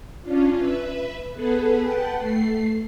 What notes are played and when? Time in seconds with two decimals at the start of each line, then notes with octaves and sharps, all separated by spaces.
0.22 C#4 D4 F4
0.57 B4 E5
1.34 B3 G#4 A4 B4
1.82 B4 F#5 G5 A5
2.19 A3 C7